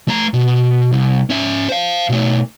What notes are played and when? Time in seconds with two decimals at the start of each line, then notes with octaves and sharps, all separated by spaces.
0.08 A3 A#5
0.34 B2
0.93 C2
1.30 C#4 E5
1.69 C5 F5
2.09 B2 A3